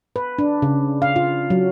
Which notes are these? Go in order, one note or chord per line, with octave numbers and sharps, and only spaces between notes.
B4
D4
C#3
F5
F4
F#3